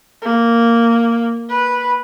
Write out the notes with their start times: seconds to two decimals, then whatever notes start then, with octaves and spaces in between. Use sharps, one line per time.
0.22 A#3
1.49 B4